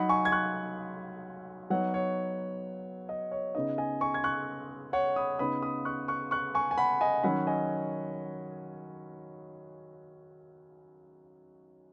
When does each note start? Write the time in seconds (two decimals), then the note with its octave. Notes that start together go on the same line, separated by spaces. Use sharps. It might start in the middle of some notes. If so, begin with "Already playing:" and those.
Already playing: F#3 D#4 F#5 B5
0.09 G#5 C#6
0.25 G#6
0.32 C#6 F#6
1.70 F#3 B3 D#4 C#5 F#5
1.94 C#5
3.09 D#5
3.31 C#5
3.55 C#3 B3 D#4 D#5
3.78 D#5 G#5
4.01 G#5 C#6
4.14 G#6
4.24 C#6 F#6
4.93 C#5 F#5
5.16 B5 D#6
5.39 C#3 B3 D#4 B5 D#6
5.62 B5 D#6
5.85 C#6 F#6
6.08 C#6 F#6
6.31 C#6 F#6
6.55 G#5 C#6
6.71 G#5
6.78 F#5 B5
7.01 D#5 G#5
7.23 D#3 F#3 C#4 F#5 B5
7.47 D#5 G#5